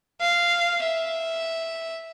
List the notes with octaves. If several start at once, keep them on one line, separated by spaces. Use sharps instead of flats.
F5
E5